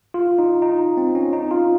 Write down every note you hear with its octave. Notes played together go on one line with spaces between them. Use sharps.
F4
D#4
D#4
C4
C#4
D#4
F4